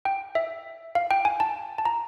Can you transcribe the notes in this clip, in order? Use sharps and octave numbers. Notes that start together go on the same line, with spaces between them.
G5
E5
F5
G5
G#5
A5
A5
A#5